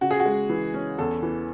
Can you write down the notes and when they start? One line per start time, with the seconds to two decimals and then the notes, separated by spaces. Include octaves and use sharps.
0.01 C#3 F#4
0.11 G#4
0.20 F#4
0.26 G#3
0.49 E3
0.74 C#4
0.98 E2 A4
1.23 E3